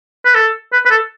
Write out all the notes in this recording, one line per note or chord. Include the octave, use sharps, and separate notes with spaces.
B4
A4
B4
B4
A4